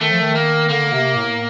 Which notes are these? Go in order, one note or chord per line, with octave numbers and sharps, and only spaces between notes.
D#3 A3
F3
D#3
A#3
D3 A#3
C3
A2